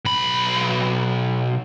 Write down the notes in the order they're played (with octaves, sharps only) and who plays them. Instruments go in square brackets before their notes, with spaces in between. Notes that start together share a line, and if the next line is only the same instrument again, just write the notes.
[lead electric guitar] B1 B5